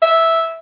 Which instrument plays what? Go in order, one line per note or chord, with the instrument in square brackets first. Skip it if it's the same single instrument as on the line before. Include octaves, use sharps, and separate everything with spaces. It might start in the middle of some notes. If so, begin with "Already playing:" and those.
[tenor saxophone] E5